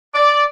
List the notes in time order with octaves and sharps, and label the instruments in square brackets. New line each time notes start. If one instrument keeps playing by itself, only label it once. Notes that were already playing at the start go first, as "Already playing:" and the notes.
[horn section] D5